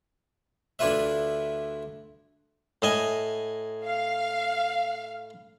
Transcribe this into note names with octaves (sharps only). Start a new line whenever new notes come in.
D2 D4 E4 F4 B4 E5
A2 D#5 G#5
F5